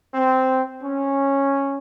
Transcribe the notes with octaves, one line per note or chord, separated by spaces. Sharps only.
C4
C#4